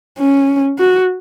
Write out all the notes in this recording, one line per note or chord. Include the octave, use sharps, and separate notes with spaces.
C#4
F#4